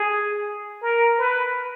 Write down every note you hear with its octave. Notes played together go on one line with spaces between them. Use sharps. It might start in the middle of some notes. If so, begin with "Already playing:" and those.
Already playing: G#4
A#4
B4